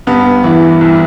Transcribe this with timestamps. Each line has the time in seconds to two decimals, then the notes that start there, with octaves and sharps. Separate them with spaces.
0.07 G2 B3
0.44 E3
0.81 C2